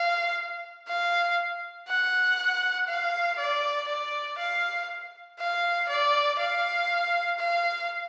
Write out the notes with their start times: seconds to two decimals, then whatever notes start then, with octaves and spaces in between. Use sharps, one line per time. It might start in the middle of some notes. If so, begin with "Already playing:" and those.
Already playing: F5
0.88 F5
1.88 F#5
2.88 F5
3.39 D5
3.88 D5
4.39 F5
5.39 F5
5.88 D5
6.39 F5
7.39 F5